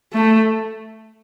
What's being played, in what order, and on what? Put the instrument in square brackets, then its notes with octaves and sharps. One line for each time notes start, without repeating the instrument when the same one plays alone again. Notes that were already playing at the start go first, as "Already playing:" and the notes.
[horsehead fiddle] A3